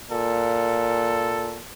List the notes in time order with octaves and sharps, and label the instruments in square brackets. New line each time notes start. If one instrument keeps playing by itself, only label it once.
[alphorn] A#2 [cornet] A4